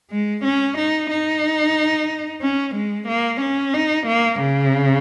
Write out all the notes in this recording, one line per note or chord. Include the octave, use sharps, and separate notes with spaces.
G#3
C#4
D#4
D#4
C#4
G#3
A#3
C#4
D#4
A#3
C#3